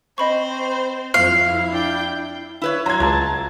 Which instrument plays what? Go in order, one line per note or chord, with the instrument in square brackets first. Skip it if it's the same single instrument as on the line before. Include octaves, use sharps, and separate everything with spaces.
[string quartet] C4 C5 [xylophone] D#5 B5 C#6
[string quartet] F2 [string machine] E4 [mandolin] F5
[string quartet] D4 G5 G6
[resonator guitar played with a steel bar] E4 B4 C#5
[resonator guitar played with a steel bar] F#3 [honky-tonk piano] A#5 G#6 [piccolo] C6
[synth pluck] C#2 [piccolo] A5